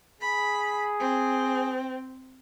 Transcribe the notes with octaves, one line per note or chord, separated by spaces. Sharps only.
G#4 B5
C4